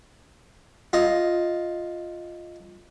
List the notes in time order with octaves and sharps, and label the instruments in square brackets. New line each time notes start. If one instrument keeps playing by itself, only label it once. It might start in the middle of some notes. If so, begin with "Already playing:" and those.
[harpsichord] F4 D#5